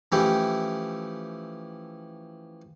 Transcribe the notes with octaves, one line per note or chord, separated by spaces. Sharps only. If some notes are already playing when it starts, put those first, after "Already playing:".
E3 F3 A3 C#4 E4 G4